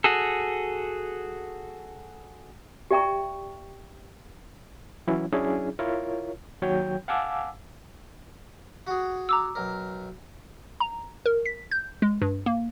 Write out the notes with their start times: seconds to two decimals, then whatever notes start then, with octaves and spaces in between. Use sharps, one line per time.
0.04 F#4 G#4 A4
2.91 G4 D5 E5 G5 A#5 C#6
5.07 E3 F#3 C#4 E4
5.32 F#3 C#4 D4 E4 G#4
5.79 E4 F4 A#4 C#5
6.62 D#2 F#3 F#4 C#5 G5 G6
7.08 F5 F#5 G#5 A5 D6 E6
8.87 F#4 G#4
9.29 A#5 D6 E6
9.55 B1 A#4
10.80 A#5
11.26 A#4
11.45 B6
11.71 G6
12.02 G#3
12.22 G2
12.46 A#3